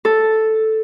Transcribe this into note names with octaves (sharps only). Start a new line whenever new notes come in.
A4